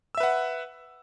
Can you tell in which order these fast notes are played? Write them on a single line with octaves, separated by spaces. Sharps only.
E6 E5 B4 F#5